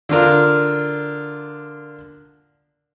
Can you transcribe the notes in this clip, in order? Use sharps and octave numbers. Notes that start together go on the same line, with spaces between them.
D3 D4 F4 A#4